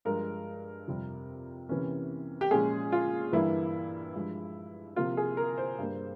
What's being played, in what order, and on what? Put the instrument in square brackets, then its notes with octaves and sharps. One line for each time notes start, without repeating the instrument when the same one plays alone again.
[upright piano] G2 F3 G#3 A#4
F2 C3 G3 C4
C3 E3 A#3 C#4
G4
A#2 F3 G#3 C#4 G#4
F4
G2 E3 G3 A#3 E4
G2 F3 G#3
C3 F3 A#3 F4
G#4
A#4
C5
G2 G3 A#3